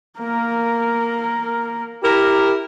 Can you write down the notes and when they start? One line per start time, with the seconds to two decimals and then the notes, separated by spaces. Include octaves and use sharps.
0.19 A#3 A#4
2.03 E4 G4 A#4